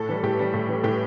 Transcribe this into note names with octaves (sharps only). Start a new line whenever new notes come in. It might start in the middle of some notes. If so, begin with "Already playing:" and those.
Already playing: A2 A4
E3 G3
A2 G4
E3 G3
A2
E3 G3
A2 G4